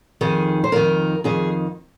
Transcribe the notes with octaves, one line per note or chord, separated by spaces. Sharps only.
F2 D#3 G#4
C5
F2 D#3 A#4
F2 D#3 G#4